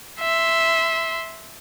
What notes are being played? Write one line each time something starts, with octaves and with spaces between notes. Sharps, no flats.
E5 C6